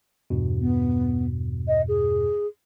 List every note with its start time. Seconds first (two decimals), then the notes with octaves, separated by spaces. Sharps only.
0.30 E2 G2 B2
0.60 B3
1.68 D#5
1.88 G#4